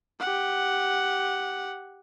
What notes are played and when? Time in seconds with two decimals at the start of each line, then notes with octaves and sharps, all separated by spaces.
0.20 G4 F#5